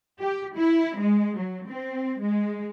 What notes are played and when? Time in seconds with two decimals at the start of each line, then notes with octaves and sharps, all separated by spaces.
0.21 G4
0.56 E4
0.97 G#3
1.37 F#3
1.69 C4
2.21 G#3